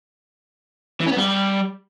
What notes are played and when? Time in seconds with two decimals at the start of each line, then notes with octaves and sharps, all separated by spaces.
1.01 E3
1.06 C#4
1.12 B3
1.17 G3